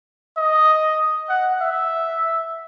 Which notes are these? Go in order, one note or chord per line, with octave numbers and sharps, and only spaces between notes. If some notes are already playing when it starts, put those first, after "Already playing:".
D#5
F#5
E5